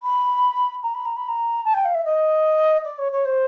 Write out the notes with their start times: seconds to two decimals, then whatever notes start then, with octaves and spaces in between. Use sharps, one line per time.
0.02 B5
0.83 A#5
0.94 B5
1.05 A#5
1.16 B5
1.28 A#5
1.64 A5
1.73 G5
1.84 F5
1.94 E5
2.04 D#5
2.84 D5
2.98 C#5
3.11 C#5
3.24 C5